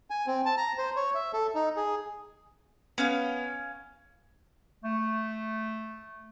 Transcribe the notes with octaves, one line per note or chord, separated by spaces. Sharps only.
G#5
C4
A5
A#5
C5
C#5
E5
A4
D#4
G#4
B3 C#4 F5
A3